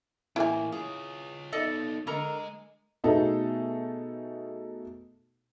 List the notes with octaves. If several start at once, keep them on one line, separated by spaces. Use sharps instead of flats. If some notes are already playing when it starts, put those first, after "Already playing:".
A2 E3 A#3 E4 G#5
F4 G#4 C#5
B3 D#4 A4 D5 D#5
D3 G#3 A#4 D#5 A#5
B2 A3 B3 D#4 G#4 A4